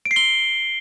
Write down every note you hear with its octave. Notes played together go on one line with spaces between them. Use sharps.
D7
C7
G7